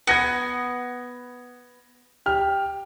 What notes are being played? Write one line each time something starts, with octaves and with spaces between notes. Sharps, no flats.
B3 G#6 A#6 C#7
G4 F6